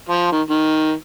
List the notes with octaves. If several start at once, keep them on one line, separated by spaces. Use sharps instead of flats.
F3
D#3
D#3